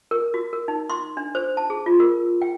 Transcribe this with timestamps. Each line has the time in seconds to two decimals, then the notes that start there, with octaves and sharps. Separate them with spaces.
0.11 A#4
0.34 F#4
0.53 A#4
0.68 D#4
0.90 C6
1.17 D4
1.35 C5
1.57 A5
1.70 G#4
1.86 F4
2.00 A#4
2.42 G5